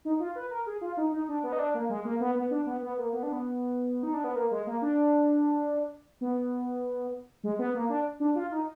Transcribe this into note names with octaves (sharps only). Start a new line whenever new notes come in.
D#4
F4
B4
A#4
G#4
F4
D#4
D#4
D4
B3
D#4
D4
A#3
G#3
A#3
B3
B3
D4
B3
B3
A#3
B3
D4
B3
D#4
D4
B3
A#3
G#3
A#3
D4
B3
G#3
B3
A#3
D4
D4
F4
D#4